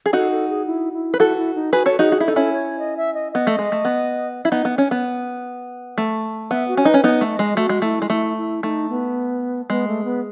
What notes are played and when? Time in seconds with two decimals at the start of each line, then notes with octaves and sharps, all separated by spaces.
0.06 G#4
0.13 D#4 F#4 A4
0.31 A4
0.49 G#4
0.66 E4
0.93 E4
1.14 B4
1.20 E4 F#4 A4
1.37 E4
1.55 D#4
1.73 F#4 G#4 B4
1.86 A4 C#5
1.99 D#4 F#4 G#4
2.12 F#4
2.20 E4
2.26 D#4 A4
2.36 C#4 E4
2.53 C#5
2.79 D#5
2.97 E5
3.14 D#5
3.32 B3 D#5
3.47 A3
3.59 G#3
3.72 A3
3.85 B3
4.45 E4
4.52 B3 D#4
4.65 B3
4.78 C#4
4.91 B3
5.98 A3
6.51 B3 E5
6.68 F#4
6.77 C#4
6.85 D#4 B4
6.94 C#4
7.04 B3 D#4
7.21 A3
7.31 D#5
7.39 G#3
7.57 A3 F#4
7.69 G#3
7.82 A3 E4
8.02 G#3
8.10 A3 E4
8.37 E4
8.63 A3 D#4
8.90 B3
9.70 G#3 B3
9.88 A3
10.05 B3